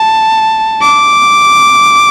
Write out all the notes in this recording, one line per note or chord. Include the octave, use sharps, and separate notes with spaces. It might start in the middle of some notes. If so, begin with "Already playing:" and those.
Already playing: A5
D6